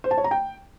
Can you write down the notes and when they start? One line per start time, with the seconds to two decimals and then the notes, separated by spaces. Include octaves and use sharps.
0.04 C5
0.11 A5
0.18 C#5
0.24 A#5
0.31 G5